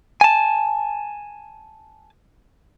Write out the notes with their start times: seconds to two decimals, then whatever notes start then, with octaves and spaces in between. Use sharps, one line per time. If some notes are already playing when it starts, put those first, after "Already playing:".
0.21 G#5 A5